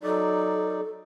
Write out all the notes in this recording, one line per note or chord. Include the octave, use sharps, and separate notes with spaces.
F#3 D#4 A4 D5